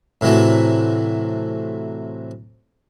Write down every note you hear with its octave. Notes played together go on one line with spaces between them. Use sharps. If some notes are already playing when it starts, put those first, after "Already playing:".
A2 C3 E3 F#3 A3